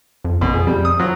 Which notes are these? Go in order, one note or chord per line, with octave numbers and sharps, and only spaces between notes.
F2
A#1 B2
F2 G#4
F2 G3
D#6
F3 F#3